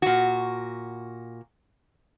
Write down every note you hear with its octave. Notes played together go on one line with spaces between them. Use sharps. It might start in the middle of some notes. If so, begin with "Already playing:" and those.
A#2 F#4